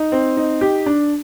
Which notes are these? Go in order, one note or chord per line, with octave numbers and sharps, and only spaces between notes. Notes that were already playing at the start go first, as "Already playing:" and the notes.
Already playing: D#4
C4
D#4
G4
D4